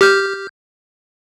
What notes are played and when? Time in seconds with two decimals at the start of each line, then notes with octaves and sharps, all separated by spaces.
0.01 G4 F6 G6